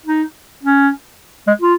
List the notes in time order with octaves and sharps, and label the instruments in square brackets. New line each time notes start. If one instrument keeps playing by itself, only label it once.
[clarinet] D#4
C#4
G#3
F4